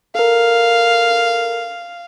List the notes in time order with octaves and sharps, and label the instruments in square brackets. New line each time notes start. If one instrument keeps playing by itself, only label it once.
[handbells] A4 A#4 [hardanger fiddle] F5